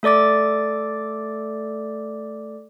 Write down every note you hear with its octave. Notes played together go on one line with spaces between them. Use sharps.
A3 A4 D5 D6 A6